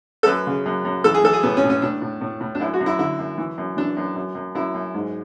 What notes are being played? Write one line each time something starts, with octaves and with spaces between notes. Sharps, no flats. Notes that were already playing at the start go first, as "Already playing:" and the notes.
A4
F#2 B4
C#3
F#2
F#2
E3 A4
G#4
E3 A4
G#4
A2 B3
C#4
A2
C#4
A2 D4
A2
A2
A2
D4
F#2 E4
F#4
F#2
E4
D3 E4
F#2
E3
F#2
E3 D4
F#2
F#2
F#2
F#2 E4
F#2
G#2